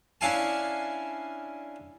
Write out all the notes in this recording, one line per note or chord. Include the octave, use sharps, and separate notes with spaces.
C#4 D4 E4 F5 G#5 A5